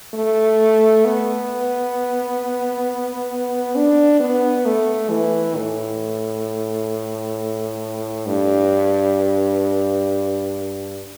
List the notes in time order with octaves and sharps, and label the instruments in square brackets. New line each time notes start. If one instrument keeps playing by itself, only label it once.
[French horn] A3
B3
D4
B3
A3
E3
A2
G2